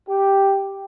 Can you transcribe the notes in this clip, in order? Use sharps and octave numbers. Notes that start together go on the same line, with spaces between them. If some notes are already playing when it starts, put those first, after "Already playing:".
G4